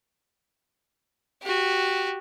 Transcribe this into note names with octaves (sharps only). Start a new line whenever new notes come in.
F#4 G4